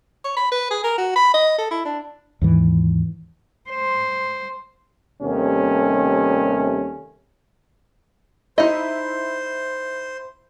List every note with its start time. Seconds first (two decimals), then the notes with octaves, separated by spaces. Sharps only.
0.24 C#5
0.36 B5
0.52 B4
0.71 G#4
0.84 A#4
0.98 F#4
1.16 B5
1.34 D#5
1.58 A4
1.71 E4
1.85 D4
2.42 D#2 G#2 E3
3.70 C5
5.21 D#2 C3 G3 A3 C#4
8.58 D#4 E4 C5 D#5